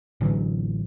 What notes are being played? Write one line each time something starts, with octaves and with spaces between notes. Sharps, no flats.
A1 D3 E3 F#3